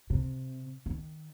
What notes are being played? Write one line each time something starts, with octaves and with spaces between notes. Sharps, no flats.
C3
D#3